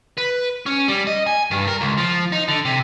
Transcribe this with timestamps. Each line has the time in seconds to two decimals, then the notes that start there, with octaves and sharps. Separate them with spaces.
0.18 B4
0.66 C#4
0.88 G3
1.07 D#5
1.27 G#5
1.51 G2
1.67 A#4
1.81 C#2
1.98 F3
2.32 D#4
2.48 D3
2.65 C3